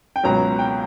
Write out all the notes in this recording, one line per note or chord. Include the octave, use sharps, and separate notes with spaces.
G5
C#2 B2 F#3 A#5
G5